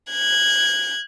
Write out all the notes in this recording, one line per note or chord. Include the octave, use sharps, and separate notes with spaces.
F#6 G#6